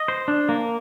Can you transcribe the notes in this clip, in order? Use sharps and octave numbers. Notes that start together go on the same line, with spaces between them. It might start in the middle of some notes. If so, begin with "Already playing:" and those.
Already playing: D#5
C5
D4
A#3